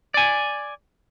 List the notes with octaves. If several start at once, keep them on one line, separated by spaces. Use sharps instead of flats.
D5 G#5